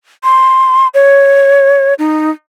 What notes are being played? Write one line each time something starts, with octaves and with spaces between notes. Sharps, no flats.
C6
C#5
D#4